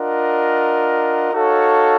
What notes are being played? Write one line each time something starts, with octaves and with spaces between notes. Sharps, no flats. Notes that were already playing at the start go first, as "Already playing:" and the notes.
Already playing: D4 F4 A#4 D#5 F#5
D#4 F#4 A4 C#5 F5